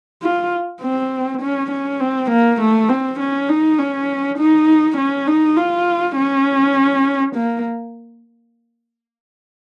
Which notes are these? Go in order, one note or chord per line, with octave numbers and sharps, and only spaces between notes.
F4
C4
C#4
C#4
C4
A#3
A3
C4
C#4
D#4
C#4
D#4
C#4
D#4
F4
C#4
A#3